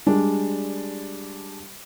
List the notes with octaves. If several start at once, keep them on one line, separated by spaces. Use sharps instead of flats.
G3 G#3 D4